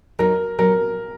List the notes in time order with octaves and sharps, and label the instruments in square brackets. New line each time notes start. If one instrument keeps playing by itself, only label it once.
[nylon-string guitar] F#3 D#4 [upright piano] A#4
[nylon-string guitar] F#3 [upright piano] A#4